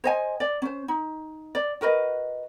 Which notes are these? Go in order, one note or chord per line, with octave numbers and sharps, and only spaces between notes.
C5 D#5 G#5
D5
C#4 C5
D#4
D5
F#4 A#4 B4 D#5